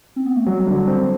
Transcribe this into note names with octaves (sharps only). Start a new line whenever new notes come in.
C4
B3
A3
F#3 G3
D3
C4